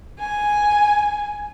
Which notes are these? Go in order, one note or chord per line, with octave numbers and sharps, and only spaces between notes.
G#5